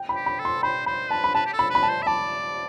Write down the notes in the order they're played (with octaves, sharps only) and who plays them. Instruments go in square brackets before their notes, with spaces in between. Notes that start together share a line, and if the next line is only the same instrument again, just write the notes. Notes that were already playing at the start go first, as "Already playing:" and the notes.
Already playing: [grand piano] G5
B5
[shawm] G4
[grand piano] B5
[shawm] A4
[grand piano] C6
[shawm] C5 [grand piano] B5
[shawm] C5 [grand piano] B5
[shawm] B4 [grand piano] A5
[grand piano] B5
[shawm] B4 [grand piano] A5
[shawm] G4
A4
[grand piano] B5
[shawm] B4 [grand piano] B5
[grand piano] A5
[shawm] C5
E5
[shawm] D5 [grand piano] A5